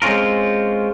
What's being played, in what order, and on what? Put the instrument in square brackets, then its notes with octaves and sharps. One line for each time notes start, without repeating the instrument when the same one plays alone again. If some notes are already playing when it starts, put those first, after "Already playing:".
[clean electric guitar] G#3 C4 C#4 F4 A#4